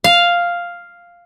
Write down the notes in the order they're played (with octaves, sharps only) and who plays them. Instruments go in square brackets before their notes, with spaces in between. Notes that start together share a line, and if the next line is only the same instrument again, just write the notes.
[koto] F5